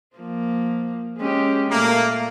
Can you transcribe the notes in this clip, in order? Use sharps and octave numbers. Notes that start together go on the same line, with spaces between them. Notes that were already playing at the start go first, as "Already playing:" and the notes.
F3 A#3
G#3 C#4 G4
A#2 A3 A#3